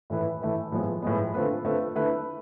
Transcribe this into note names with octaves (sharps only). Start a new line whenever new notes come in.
A2 E3 A3 E4 B4
A2 E3 A3 E4 B4
A2 F3 G#3 B3
A2 F3 G#3 B3
D3 A3 C4 F4 B4
D3 A3 C4 F4 B4
D3 A3 E4 B4